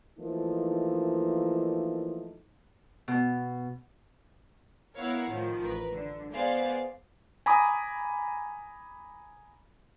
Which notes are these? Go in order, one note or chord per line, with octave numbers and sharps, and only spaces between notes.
E3 F3 A3 A#3 D#4
B2
B3 E4 A#4 C#5 F5 F#5
A2 D#3 F3
A1 A#4 B4
D3
B3 G#4 C5 D5 F5 F#5
G#5 A#5 B5 D6 D#6